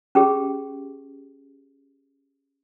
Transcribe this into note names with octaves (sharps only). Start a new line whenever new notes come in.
C#4 G4 G#4